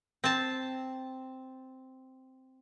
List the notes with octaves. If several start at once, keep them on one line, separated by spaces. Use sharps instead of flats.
C4 A5